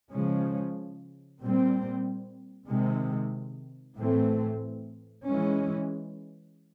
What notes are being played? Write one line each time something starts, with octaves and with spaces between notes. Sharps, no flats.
C#3 F3 G#3 C#4
A#2 G3 C4
C3 D#3 G#3
A2 E3 A3 C4
E3 G#3 C#4